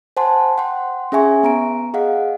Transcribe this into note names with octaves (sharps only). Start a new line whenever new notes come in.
C5 F#5 G#5 A5 C6
F#5 G5 C6
C#4 G#4 E5 G#5 C#6
B3 A#5 D7
G#4 D#5 F5 F#5